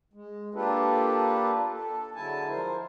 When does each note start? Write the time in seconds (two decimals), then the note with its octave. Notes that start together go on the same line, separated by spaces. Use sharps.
0.14 G#3
0.55 A#3 D4 F4 G4 A4 B4
1.72 A4
2.15 D3 F#3 G#3 E4 G#5 A5
2.49 F3 A#4 C5